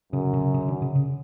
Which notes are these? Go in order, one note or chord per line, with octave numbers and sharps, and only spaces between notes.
F#2 C#3
C#3
C#3
D3
C#3
C#3